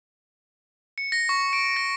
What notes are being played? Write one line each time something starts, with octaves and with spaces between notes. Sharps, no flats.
C#7
A#6
C#6
D7
A#6